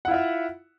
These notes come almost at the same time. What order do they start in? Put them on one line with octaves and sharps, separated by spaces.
F#5 E4 F4 E5